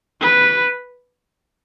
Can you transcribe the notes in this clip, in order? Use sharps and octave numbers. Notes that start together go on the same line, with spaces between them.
B4